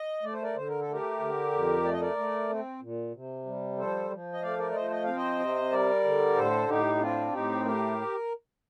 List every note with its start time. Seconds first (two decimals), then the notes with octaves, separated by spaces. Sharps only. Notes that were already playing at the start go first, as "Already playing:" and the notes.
Already playing: D#5
0.23 A3 D5
0.33 C5
0.42 A#4 D5
0.56 D3 C5
0.68 A#4
0.80 A4
0.88 A3 G4 A#4
1.20 D3
1.52 F2
1.84 A3 D5
1.93 D#5
2.00 A#4 D5
2.17 A3
2.50 C4
2.82 A#2
3.14 C3
3.46 G3
3.78 F3 A4 C5
4.11 F3
4.33 D#5
4.42 A3 D5 F5
4.58 A#4 D5
4.71 D5
4.75 F3 C5 D#5
4.91 D#5
5.04 C4 F5
5.16 C5 D#5
5.39 C3
5.72 G3 A#4 D5
6.04 D3
6.36 A2 A4 C5
6.68 A2 D#4 G4
6.95 G4
7.00 C4 D4 F4
7.32 A2 D#4 G4
7.65 A3 G4 A#4